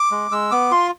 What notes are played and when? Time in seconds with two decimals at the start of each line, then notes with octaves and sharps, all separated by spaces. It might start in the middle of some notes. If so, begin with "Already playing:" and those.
Already playing: D6
0.11 G#3
0.31 G#3 E6
0.51 B3 D6
0.71 F4 C6